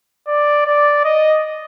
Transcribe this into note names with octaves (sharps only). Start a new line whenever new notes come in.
D5
D5
D#5